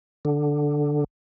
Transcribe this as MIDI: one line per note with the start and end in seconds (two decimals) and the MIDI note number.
0.25 1.04 50